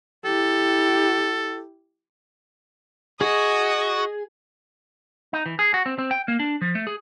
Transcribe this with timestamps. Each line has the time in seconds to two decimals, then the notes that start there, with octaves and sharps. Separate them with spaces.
0.25 E4 G4 A4
3.21 F#4 G#4 D#5
5.33 D#4
5.46 E3
5.59 G#4
5.74 F#4
5.86 C4
5.98 C4
6.11 G5
6.28 A#3
6.40 D4
6.61 F3
6.75 A3
6.87 G#4